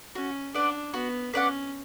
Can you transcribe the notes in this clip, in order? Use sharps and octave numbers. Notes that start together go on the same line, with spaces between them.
C#4 F#4
D4 B4 D5 F#5
B3 F#4
C#4 B4 D5 F#5